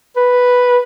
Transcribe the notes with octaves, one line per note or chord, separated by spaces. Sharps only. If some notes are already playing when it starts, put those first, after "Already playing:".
B4